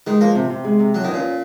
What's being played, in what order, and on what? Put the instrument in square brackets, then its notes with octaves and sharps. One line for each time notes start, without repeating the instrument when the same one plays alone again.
[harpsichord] D#3 [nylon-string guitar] G#3
[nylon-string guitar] F3 [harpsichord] A#3
[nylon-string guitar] C3
C3
G#3
C3
[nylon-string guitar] F3 [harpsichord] F#3
[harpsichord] D#3
[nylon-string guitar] C#4
[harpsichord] A#2